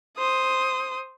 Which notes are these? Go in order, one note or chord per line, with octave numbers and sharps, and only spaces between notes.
C5 D#6